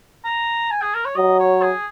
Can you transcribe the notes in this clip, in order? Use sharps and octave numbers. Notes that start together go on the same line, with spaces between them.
A#5
G#5
G#4
A#4
C#5
F#3 D#5
C#5
G#4